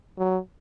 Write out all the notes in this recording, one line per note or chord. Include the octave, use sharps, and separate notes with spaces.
F#3